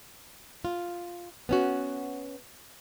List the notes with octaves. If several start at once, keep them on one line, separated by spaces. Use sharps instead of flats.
F4
B3 C#4 F#4